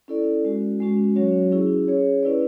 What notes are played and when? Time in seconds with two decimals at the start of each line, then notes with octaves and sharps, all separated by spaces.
0.08 C#4 E4 A4 D5
0.45 G#3 C#4 F#4
0.80 G#3 C#4 F#4
1.16 F#3 C#4 F#4 C#5
1.52 C#4 E4 G#4
1.88 C#4 G#4 C#5
2.23 C#4 E4 B4 D5